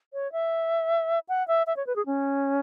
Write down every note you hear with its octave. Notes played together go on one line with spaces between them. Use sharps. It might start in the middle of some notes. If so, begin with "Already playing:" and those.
C#5
E5
F#5
E5
E5
C#5
B4
G#4
C#4